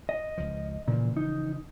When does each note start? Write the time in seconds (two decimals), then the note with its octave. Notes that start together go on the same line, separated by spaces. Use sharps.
0.09 D#5
0.38 C#2 F3
0.88 A#2 C#3 E3 F3
1.17 D#4